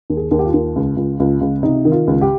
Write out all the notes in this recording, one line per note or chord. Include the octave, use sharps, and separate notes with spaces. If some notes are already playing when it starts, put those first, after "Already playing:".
D#2
G#4
D#2
G4
F4
D#2
C#2
C#2
C#2
C#2
C3 D#4
D#3
F4
C#2
G4